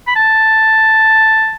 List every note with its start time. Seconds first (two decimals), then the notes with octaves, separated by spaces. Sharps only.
0.08 B5
0.16 A5